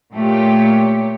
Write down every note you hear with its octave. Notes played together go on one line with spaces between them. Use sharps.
A#2 A3 G4 C#5